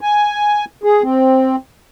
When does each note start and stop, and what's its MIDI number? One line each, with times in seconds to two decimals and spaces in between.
0.01 0.65 80
0.84 1.02 68
1.03 1.56 60